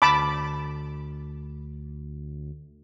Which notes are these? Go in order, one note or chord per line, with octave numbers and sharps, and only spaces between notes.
D2 A5 B5 D6